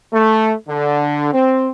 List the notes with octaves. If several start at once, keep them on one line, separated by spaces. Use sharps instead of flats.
A3
D3
C4